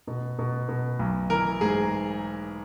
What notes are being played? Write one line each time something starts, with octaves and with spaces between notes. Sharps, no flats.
B2
B2
B2
B1
E3 A#4
G#2 G#4